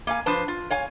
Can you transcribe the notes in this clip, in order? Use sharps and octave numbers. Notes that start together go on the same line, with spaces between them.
A#3 F5 G#5
F3 D4 B4 C5 A5
F4
C#5 F5 G#5